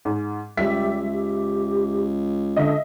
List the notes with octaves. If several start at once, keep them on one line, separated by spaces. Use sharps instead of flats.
G#2
C#2 G3 E5 B6
G4
D3 D#5 E5